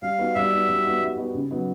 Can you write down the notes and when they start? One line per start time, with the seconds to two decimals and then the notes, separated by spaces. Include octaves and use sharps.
0.02 G3 F5
0.18 B3 D#4 F#4
0.35 G3 E5
0.51 B3 D#4 F#4
0.69 G3
0.85 B3 D#4 F#4
1.01 G3
1.17 B3 D#4 F#4
1.34 C#3
1.51 F#3 B3 D#4 F#4